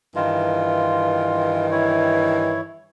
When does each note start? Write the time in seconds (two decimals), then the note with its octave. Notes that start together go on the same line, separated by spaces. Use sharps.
0.16 G2 D#3 E3 F4
1.71 E4 C#5